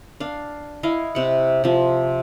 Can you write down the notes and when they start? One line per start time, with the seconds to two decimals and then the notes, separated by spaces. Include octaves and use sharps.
0.20 D4 F5
0.83 E4 D#5 F5
1.15 C3 F#5
1.64 C3 F3